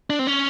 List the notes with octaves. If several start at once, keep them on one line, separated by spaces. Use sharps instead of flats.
D4
C4
C#4